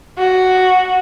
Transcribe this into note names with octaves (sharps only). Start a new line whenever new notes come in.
F#4